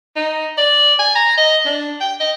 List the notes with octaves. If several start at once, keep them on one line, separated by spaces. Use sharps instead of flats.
D#4
D5
G#5
A#5
D#5
D4
G5
D#5